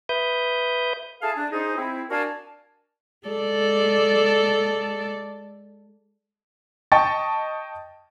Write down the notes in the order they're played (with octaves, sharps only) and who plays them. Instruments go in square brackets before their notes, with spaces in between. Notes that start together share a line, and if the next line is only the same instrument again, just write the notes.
[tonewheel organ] B4 E5 D#6 G6
[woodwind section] E4 G#4 A4 F5 G#5 A5
D4
D#4 G#4 C5
C4 E4
D4 F#4 A#4 F5 G#5 A5
[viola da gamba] G#3 A4 D5
[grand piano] D#5 G5 A5 C#6 A6